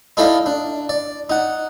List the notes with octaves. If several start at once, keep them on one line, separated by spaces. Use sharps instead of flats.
D#4 E4 A4 D5 D#5 F5
D4
D5
D#4 F#5